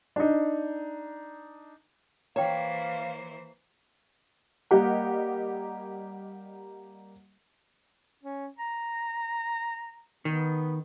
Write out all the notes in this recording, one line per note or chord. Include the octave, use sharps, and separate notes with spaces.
D4 D#4
E3 A#3 C5 C#5 F5 G5 A#5
G3 A#3 G4 A#4 D#5 F#5
C#4
A#5
D#3 B3